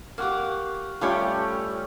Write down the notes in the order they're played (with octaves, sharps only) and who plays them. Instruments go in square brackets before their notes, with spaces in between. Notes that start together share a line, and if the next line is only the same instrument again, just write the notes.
[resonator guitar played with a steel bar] A#3 G4 [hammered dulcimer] F5 F#5 C#6
[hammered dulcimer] G3 A3 C#4 [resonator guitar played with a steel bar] F4 G4 C#5